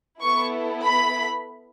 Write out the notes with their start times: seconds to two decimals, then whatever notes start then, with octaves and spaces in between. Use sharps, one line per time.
0.21 B3 E4 A4 C#6
0.84 B5